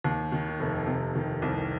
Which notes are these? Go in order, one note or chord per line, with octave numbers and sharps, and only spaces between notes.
D#2
D#3
F1
C3
D#3
C2